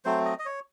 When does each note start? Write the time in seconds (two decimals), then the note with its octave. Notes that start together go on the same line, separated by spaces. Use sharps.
0.05 F#3 A3 C4 C5
0.25 D#5
0.39 D#5
0.45 C#5